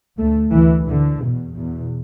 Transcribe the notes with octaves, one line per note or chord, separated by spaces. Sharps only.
D2 A3
D2 E3
D2 D3
E2 B2
E2 B2